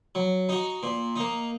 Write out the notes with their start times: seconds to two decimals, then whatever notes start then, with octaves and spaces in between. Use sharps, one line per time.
0.15 F#3
0.49 D#4 F#4
0.83 A#2
1.16 A#3 D#4